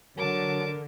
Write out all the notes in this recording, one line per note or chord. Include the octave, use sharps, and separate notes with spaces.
D3 F#3 A#4 A5 D6